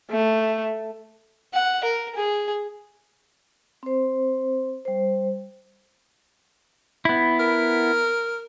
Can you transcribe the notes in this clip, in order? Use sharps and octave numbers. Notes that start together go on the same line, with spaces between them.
A3
F#5
A#4
G#4
C4 C5
G3 C5
B3 E4
A#4